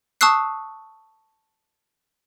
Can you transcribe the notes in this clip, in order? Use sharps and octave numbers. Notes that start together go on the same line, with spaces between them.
A5 C#6 D#6 E6 F#6 C7